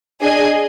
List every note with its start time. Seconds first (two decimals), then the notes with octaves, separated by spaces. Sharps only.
0.21 D4 G#4 D#5 G#5